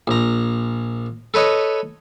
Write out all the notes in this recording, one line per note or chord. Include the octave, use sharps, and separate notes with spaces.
A#1 A#5
A4 B4 C#5 D#5